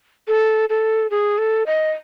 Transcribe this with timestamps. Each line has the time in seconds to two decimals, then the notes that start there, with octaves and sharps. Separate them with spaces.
0.28 A4
0.70 A4
1.11 G#4
1.38 A4
1.67 D#5